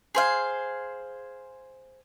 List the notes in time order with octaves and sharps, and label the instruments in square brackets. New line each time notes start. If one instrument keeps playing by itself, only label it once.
[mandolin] G#4 C5 F5